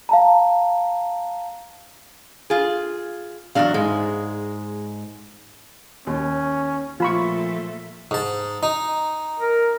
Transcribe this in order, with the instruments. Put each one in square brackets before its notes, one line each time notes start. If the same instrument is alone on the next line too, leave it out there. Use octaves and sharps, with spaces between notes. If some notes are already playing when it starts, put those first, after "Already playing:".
[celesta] F5 A5 A#5
[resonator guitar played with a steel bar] F4 G#4
[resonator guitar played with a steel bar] E2 G#2 F5 [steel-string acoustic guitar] F#3 D4
[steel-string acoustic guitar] G#2 [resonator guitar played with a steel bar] G#3
[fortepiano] D#2 [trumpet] C#4
[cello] A#2 A3 [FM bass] F3 [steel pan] F4 B5 C#6
[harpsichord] G#2 A5
D#4
[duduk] A#4